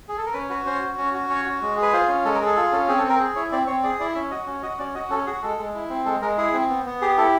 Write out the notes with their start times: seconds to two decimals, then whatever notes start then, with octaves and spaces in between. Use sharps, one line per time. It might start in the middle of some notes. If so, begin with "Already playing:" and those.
0.08 G#4
0.17 A4
0.26 A#4
0.34 C#4 B4
0.49 F#4 B4
0.66 C#4 C5
0.82 F#4
0.98 C#4
1.14 F#4
1.30 C#4 C#5
1.45 F#4
1.62 G#3
1.77 G#4
1.82 B4
1.93 F4 C5
2.08 C#4
2.25 G#3 A4
2.35 A#4
2.41 G#4 A4
2.56 F4 A4
2.72 C#4 A4
2.88 C4 G#4
2.98 A4
3.04 C4
3.09 A#4
3.20 G#4
3.35 E4 C#5
3.52 C4 D5
3.67 C4 C#5
3.83 G#4 D5
4.00 E4 D5
4.15 C#4 E5
4.31 F#4 D#5
4.46 C#4
4.63 F#4 D#5
4.79 C#4 D5
4.95 F#4 D#5
5.10 C#4 A4
5.26 F#4 G#4
5.43 G#3 A4
5.58 G#3
5.75 E4
5.90 C4
6.05 G#3 A4
6.21 G#3 A#4
6.38 E4 G#4
6.53 C4
6.70 B3
6.86 B3
7.02 G4 G#4
7.18 E4 A4